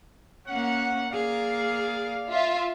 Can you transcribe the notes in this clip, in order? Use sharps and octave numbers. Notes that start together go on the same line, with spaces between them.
A#3 C#4 F#5
A#3 G#4 D5 F5
F4 E5